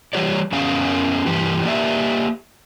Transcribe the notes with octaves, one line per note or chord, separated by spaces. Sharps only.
E3 G3 G4 C#5 D5
F#2 B3 C#4 F5 G#5
G2 E3 G4
A#3 G4 D5 E5